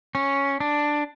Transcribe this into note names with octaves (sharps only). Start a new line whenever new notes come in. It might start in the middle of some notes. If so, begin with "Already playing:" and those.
C#4
D4